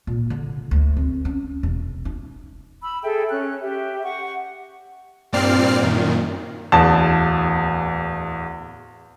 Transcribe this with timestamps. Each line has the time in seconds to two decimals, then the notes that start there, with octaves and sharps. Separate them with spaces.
0.07 A#2
0.30 D3
0.71 D2
0.97 C4
1.25 C#4
1.63 E1
2.05 D#4
2.83 B5 E6
3.03 G#4 A4 E5 G5
3.30 C#4 F#6
3.62 G4 E5
4.03 F#5 C#6
5.33 G2 A#2 C4 D5 F6 C7
5.81 F#2 A#2 D#3
6.72 D1 E2 A5